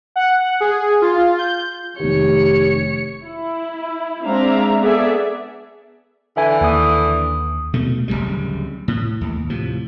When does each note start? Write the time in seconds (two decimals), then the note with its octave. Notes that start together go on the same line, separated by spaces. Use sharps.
0.16 F#5
0.60 G#4
1.02 F4
1.38 G6
2.00 F1 D#3 G4 C#5 C#7
3.24 E4
4.24 G#3 C4 D4 E5 F5 A#5
4.81 B3 G#4 A4 D5 E5
6.37 D3 E3 E5 G#5
6.61 D#2 D#6
7.73 B2 A3
8.08 D1 C#2 C#3 G3
8.88 A2
9.21 D#2
9.50 A2 C3 F3